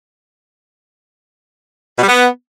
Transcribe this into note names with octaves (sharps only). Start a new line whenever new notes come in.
B2
G3
B3